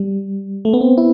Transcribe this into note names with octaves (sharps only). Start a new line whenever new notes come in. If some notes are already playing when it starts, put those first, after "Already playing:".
Already playing: G3
A3
B3
C4
E4